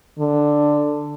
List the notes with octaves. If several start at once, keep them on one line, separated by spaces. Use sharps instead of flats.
D3